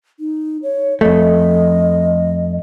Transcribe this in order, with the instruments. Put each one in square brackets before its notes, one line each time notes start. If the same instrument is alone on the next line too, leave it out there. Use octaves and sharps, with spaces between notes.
[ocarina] D#4
C#5
[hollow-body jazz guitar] F2 A3 [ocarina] D#5